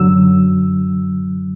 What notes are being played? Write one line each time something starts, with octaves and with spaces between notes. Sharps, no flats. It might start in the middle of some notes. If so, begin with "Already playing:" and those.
Already playing: F#2 D3 F#3 E6